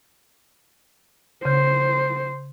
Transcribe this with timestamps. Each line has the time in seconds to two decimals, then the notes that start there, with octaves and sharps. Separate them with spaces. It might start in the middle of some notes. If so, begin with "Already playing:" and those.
1.45 C#3 C5 G6